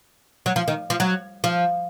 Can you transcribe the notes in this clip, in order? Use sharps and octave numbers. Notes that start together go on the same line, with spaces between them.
F#3
F3
D#3
F3
F#3
F3